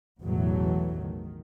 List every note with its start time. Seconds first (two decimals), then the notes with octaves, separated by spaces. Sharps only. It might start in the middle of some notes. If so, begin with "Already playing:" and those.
0.21 A1 E2 B2 E3 F#3 A3
1.03 D#3